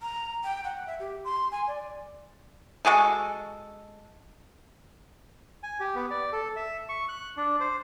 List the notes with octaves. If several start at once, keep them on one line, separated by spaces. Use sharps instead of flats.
A#5
G5
F#5
E5
G4
C6
G#5
D5
G#3 F#4 G#4 A4
G#5
G4
B3
D5
A4
E5
C#6
F#6
D4
C5